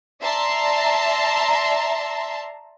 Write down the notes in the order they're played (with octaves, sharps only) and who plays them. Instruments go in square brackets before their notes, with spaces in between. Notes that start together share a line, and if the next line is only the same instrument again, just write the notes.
[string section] D5 E5 A5 A#5 C6